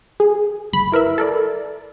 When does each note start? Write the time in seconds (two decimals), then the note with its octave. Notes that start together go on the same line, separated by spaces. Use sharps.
0.20 G#4
0.73 G1 B5
0.92 E4 A#4 B4 E5
1.18 A4 A#4 D5